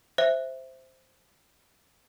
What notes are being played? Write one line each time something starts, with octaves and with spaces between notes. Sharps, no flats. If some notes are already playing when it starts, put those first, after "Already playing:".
C5 E5